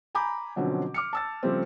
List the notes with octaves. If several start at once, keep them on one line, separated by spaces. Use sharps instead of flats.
G#5 A#5 B5 D6 G6
B2 D3 F3 F#3 C4 C#4
D6 F6 C#7
A5 E6 A6
C#3 F3 G3 A3 C4